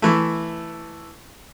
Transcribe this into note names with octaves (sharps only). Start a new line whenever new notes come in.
E3 A3